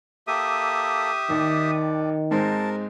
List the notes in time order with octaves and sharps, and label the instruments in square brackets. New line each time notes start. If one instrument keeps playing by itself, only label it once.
[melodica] A#3 A4 [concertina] G4 E5 D#6
[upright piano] D#2 [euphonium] D#3 [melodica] D5
[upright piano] G#2 G#3 C4 [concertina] A#4 [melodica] A5